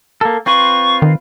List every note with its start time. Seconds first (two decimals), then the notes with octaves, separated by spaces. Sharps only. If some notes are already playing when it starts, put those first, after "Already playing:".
0.21 A#3 A4
0.46 C4 F4 B4 C#6
1.02 D#3